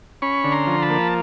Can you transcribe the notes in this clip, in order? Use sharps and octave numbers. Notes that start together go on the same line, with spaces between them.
C#4 B5 C#6
D3
A#5 C6
F3
A5 B5
A#3